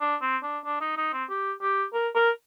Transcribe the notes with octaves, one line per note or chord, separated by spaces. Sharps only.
D4
C4
D4
D4
D#4
D#4
C4
G4
G4
A#4
A#4